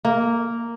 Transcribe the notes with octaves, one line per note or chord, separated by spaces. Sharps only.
A#3